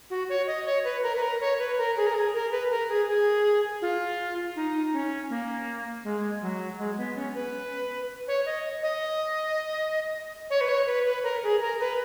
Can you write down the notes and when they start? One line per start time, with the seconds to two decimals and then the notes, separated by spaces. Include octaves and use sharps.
0.10 F#4
0.29 C#5
0.47 D#5
0.66 C#5
0.84 B4
1.03 A#4
1.15 B4
1.22 A#4
1.41 C#5
1.59 B4
1.78 A#4
1.97 G#4
2.07 A#4
2.14 G#4
2.34 A#4
2.51 B4
2.70 A#4
2.89 G#4
3.08 G#4
3.82 F4
4.56 D#4
4.93 C#4
5.30 A#3
6.04 G#3
6.42 F#3
6.79 G#3
6.98 B3
7.15 C#4
7.35 B4
8.28 C#5
8.46 D#5
8.83 D#5
10.50 C#5
10.61 B4
10.68 C#5
10.87 B4
11.05 B4
11.24 A#4
11.43 G#4
11.61 A#4
11.80 B4